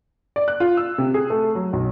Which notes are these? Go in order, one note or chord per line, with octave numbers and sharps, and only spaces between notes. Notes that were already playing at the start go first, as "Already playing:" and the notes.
D5
F#6
F4
E6
C3
G#4
A3
F#3
B1